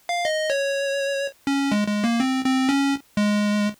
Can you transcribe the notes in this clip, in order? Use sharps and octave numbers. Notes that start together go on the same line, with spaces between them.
F5
D#5
C#5
C#4
G#3
G#3
A#3
C4
C4
C#4
G#3